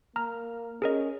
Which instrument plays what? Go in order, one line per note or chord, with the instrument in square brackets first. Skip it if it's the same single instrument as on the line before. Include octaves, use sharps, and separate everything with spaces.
[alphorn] A#3 [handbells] A#5 F6
[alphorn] C#4 [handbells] G#4 A#4 D#5